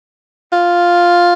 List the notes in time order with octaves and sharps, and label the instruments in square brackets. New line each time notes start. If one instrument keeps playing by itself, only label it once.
[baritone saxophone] F4